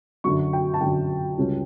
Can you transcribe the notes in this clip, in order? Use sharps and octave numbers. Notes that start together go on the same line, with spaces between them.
F#2 D3 F#3 C#6
G5
A5
F#2 D3 F#3 G5
C#2 C#3 G3 C#4